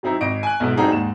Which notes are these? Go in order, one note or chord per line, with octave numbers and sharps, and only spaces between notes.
F#3 C4 D#4 E4
G#1 D#5 D7
G#5 F#6
B1 G#2 B3 E4
G3 C4 D4 D#4 F#4 G#4
D#2 G#2 E7